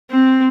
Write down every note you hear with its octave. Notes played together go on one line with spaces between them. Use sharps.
C4